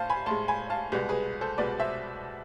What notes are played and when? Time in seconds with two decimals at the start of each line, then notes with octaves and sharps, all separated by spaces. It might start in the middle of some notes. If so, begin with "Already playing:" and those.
Already playing: A2 C5 F5 A5
0.10 G#5 B5
0.26 A2 G#3 A5 C6
0.48 G#5 B5
0.70 F5 A5
0.92 C2 B2 G#3 G#4 B4
1.09 G#4 B4
1.41 A4 C5
1.58 C2 B2 G#3 B4 D5
1.80 C5 E5